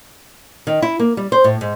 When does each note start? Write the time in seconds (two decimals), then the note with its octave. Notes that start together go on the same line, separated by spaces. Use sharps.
0.67 D#3
0.82 E4
0.99 A#3
1.17 G3
1.32 C5
1.44 A2
1.61 G#2